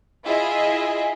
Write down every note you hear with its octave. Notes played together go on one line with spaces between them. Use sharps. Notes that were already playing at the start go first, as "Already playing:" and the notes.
E4 F4 G#4 D#5 E5